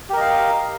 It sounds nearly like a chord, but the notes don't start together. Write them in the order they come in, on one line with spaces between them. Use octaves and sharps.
G4 A#4 D#5 F5